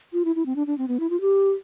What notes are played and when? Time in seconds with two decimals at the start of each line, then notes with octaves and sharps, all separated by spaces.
0.13 F4
0.25 E4
0.36 E4
0.46 C4
0.56 D4
0.67 D4
0.78 C4
0.88 B3
1.00 E4
1.10 F4
1.21 G4